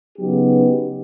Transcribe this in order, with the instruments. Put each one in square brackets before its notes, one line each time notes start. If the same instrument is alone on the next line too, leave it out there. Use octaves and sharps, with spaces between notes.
[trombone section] C#3 F#3 B3 D#4 G4